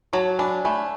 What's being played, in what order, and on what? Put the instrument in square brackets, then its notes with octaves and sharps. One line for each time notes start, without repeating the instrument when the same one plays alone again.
[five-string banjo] F#3 [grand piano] A5 C#6
[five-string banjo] D4 [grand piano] G#5 B5
[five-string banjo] A3 [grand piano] G#5 B5